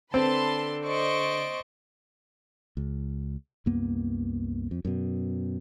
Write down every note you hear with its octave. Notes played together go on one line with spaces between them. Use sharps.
D3 C4 B4 A5 C6
C5 D5 D#5 C#6 D7
C#2
C2 F#2 A#3 B3
F2
F#2 B2